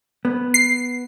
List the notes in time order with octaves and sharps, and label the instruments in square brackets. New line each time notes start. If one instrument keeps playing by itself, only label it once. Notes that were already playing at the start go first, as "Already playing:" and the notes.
[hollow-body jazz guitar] B3
[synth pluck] C7